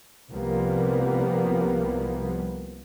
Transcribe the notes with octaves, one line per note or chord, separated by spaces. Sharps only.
C2 C3 F3 G3 A#3 B3